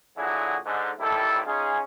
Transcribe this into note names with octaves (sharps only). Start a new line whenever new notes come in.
A#2 D3 F#3 E4 F#4 G#4
G#2 D3 G#3
A1 D#2 G3 E4 A4
C#4 D#4 F4 G#4